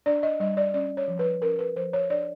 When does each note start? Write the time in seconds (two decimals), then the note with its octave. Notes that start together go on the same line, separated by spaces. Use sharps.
0.06 D4 D5
0.23 D#5
0.40 G3 D#5
0.57 D5
0.74 C#4 D5
0.97 C#5
1.08 F3
1.19 B4
1.42 C#4 A#4
1.59 B4
1.76 F3 C5
1.93 C#5
2.10 D4 D5